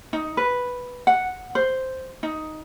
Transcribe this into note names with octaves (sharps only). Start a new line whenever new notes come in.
D#4
B4
F#5
C5
D#4